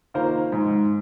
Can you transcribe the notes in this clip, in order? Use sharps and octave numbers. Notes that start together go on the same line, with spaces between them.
D#3 A#3 F4 C5
G#2